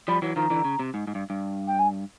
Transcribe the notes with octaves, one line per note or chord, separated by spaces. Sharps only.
F3 G3 B5
E3 F#3
D#3 F3 A#5
D3 E3
C#3
C3
G#2
G#2
G2
G2
G5
G#5